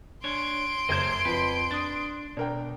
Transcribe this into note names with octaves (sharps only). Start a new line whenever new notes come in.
D4 C#5 C6 D7
F#1 C5 C#5 D#5 G#6
F2 B4
D4 D#6 A6
B2 D4 A#4 G5